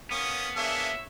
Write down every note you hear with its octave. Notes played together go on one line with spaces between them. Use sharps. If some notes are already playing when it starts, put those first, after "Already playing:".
A#3 B3 C#4 D#6
A#3 D4 G#4 C#5 E5